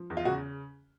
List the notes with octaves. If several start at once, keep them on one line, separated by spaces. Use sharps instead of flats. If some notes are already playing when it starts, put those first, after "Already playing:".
Already playing: F3
E2
F4
C#3 F#4